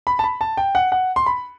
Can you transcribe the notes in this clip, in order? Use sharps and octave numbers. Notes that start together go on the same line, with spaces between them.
B5
A5
B5
A5
G5
F#5
F#5
C6
B5